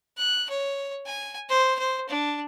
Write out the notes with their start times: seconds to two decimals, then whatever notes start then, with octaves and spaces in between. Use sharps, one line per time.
0.17 F#6
0.49 C#5
1.06 G#5
1.49 C5
1.79 C5
2.09 D4